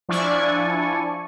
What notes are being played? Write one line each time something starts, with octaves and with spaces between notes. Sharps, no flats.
F3 D4 E4 D5 G#5 C#6